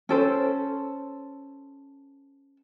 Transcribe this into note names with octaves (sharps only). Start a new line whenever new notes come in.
C#4 A4 C5